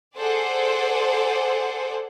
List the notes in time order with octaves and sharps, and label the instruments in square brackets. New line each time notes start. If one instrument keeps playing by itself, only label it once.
[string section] G#4 A4 C5 D5 F#5